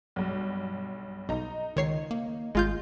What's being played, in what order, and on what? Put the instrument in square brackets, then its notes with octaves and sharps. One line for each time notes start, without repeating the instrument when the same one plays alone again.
[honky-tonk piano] B1 G2
[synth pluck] B1 [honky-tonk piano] D#4 A#5
[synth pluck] C#2 C#5 C7 [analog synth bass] D#3
[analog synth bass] A#3
[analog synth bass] G#1 [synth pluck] G#3 F4 G6